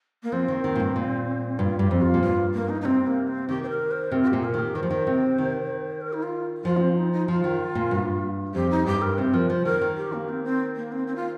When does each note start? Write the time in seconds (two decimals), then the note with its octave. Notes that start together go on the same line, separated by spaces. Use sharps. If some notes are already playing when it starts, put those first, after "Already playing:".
0.23 A#3
0.32 F3 C4
0.48 D#3
0.64 D#3
0.76 A#2
0.79 G2
0.96 A#2
1.59 G2 F4
1.79 G2 G4
1.91 F2
2.02 F4
2.14 A#2
2.23 G2 F4
2.54 A#3
2.69 D#4
2.81 D#4
2.85 C3 C4
3.06 A#3
3.27 C4
3.49 D#3 G4
3.63 C5
3.70 A#4
3.91 C5
4.11 C3 A#4
4.23 F4
4.28 G4
4.33 A#2
4.44 A#4
4.54 D#3
4.59 G4
4.75 D#3 C5
4.83 F3
4.90 D#3
5.07 C3
5.38 D#3
6.01 A#4
6.13 D#4
6.23 F4
6.65 F3 F4
6.77 A#3
6.81 C4
6.96 D#4
7.12 D#4
7.28 F3 F4
7.44 D#3
7.75 A#2
7.91 G2
8.55 F2 G4
8.71 D#4
8.86 G2 G4
9.02 A#4
9.18 C3 C5
9.33 F3 A#4
9.49 F3 C5
9.65 D#3 A#4
9.81 D#3
9.97 G4
10.13 A#3
10.29 C4
10.44 C4
10.76 A#3
10.92 C4
11.07 C4
11.16 F4